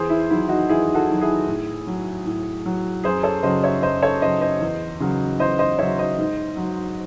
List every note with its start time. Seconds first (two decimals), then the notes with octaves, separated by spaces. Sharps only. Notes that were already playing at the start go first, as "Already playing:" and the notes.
Already playing: E2 G#4 C5
0.10 E4
0.30 D#3 F#3 E4
0.49 D#4 F#4
0.69 E2 E4 G#4
0.95 F#4 A4
1.08 D#3 F#3
1.21 E4 G#4
1.47 A2
1.87 F#3
2.25 A2
2.66 F#3
3.04 F#2 G#4 C5
3.23 A4 C#5
3.43 C#3 F#3 C5 D#5
3.63 C#5 E5
3.83 F#2 C5 D#5
4.02 A4 C#5
4.22 C#3 F#3 C5 D#5
4.41 C5 D#5
4.61 E2
5.00 C#3 F#3
5.40 E2 C5 D#5
5.59 C5 D#5
5.79 C#3 F#3 C#5 E5
5.99 C5 D#5
6.18 G#2
6.57 F#3